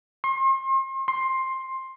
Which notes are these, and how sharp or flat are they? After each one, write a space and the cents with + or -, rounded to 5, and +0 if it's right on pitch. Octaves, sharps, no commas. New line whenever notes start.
C6 +40
C6 +15